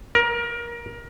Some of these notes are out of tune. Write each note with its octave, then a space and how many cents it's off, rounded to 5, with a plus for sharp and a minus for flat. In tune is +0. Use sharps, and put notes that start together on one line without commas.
A#4 +25